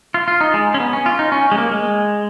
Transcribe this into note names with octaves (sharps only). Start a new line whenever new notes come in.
F4
F4
D#4
G#3
C#4
B3
C#4
F4
D#4
C#4
G#3
A#3
G#3